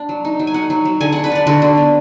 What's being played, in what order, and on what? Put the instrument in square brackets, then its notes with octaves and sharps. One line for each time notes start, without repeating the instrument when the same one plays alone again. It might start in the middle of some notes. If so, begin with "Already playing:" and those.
Already playing: [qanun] D4
F#3
D#4
F#3
G#5
D#4 F#5
F#3
F#3
D3 G#5
D4 F#5
B4
D4 D5
D3 F#4
D3
B3